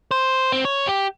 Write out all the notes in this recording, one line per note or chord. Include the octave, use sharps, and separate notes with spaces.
C5
C4
C#5
G4